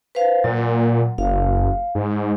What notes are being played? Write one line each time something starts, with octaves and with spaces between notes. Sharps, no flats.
B4 C5 F5
A#2 F#3
F#1 F5
G#2